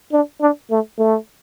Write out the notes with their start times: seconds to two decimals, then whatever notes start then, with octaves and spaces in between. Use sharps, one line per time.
0.12 D4
0.41 D4
0.70 A3
0.98 A3